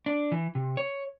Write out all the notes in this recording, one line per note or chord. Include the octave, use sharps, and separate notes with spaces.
D4
E3
C3
C#5